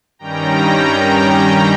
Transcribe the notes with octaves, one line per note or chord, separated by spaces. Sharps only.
G2 D#3 G3 C#4 G5 A#5